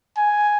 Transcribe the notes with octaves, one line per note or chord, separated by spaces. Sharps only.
G#5